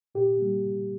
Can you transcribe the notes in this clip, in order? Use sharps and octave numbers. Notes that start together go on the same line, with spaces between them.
A#2 G4
G3 A#3